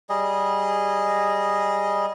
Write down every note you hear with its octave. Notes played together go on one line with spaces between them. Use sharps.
G3 G#4 D#5